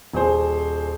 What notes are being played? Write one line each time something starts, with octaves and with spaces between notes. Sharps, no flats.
D#1 G#4 C5